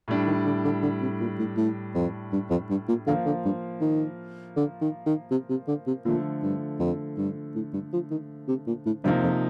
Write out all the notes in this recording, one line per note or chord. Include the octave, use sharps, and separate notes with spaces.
A2 G3 D4
D#3
D3
D3
D3
C3
A#2
A2
A2
F2
G2
F2
G2
A#2
D3 F3 A#3 F4
D3
G2
D#3
D3
D#3
D#3
C3
C3
D3
C3
A#2 D3 F3 A3
G2
F2
G2
A2
G2
F3
D#3
C3
A#2
A2
G2 C3 F3 A#3 D#4
F2